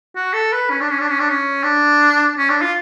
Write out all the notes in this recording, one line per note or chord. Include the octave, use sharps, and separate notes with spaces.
F#4
A4
B4
C#4
D4
C#4
D4
C#4
D4
C#4
D4
C#4
D4
F4